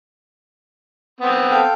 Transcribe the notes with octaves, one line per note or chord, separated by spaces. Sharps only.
B3 C4
A4 F5 G5